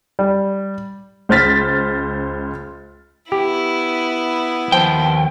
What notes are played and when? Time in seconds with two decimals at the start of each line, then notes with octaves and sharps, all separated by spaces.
0.19 G3
1.29 C#2 C5 F6 A6 B6
3.32 B3 E4 G4
4.72 D#2 F3 G5